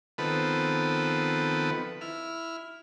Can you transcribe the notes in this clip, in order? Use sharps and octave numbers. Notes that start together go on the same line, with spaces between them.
D#3 F3 B3 C4 A4 B4
E4 F6